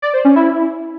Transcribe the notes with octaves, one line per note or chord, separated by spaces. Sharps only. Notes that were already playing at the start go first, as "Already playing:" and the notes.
D5
C5
C#4
E4